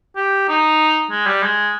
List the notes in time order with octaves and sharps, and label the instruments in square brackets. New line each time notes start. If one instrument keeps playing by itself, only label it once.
[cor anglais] G4
D#4
G#3
G3
G#3